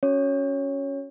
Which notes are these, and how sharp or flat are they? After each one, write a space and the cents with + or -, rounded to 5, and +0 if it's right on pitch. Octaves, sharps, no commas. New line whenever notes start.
C#4 +0 F#4 +0 C#5 +0